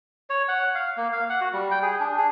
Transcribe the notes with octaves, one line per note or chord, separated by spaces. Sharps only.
C#5
F#5
F5
A#3
F5
F#5
F#4
G3
G5
G#4
D4
G#4